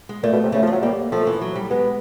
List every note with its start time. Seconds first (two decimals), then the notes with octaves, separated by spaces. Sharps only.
0.09 G#3
0.23 A#2 A3
0.33 B2
0.43 C3
0.52 C#3 A3
0.63 F3
0.67 F#3 A3
0.82 G3 A#3
1.12 F3 A3
1.27 E3
1.41 F#3
1.56 G3
1.70 G#3 B3